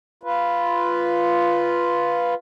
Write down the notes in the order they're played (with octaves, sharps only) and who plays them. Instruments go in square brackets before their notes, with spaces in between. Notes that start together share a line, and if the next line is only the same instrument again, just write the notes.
[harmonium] F4 B4